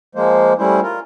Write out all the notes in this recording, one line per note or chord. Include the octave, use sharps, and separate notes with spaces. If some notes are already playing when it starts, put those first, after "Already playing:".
F3 G#3 A#3 C5
G3 A3 C#4 E4 C5
F4 A#4